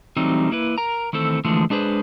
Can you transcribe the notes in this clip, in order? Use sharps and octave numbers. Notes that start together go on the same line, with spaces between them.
E3 F#3 G3 A3 C4 D#4
A#3 E4 B4
A#4 A#5
D#3 E3 A3 C4 A4
D3 E3 F3 G#3 A3
G#3 D4 G#4 B4 C5